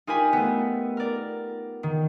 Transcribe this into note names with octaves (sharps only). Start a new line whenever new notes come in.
D#4 F4 G4 A#4 G#5 B5
A3 B3
A#4 D5
D#3